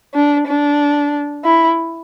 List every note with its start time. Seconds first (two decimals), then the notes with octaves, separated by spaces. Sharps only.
0.14 D4
0.47 D4
1.44 E4